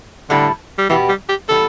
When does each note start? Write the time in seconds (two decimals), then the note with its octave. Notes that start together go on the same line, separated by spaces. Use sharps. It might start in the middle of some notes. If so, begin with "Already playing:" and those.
0.30 A2 D3 G3 E4 A4
0.78 G3
0.89 B2 E3 B3 G4
1.08 G3
1.29 G4
1.48 A2 E3 G3 B3 A4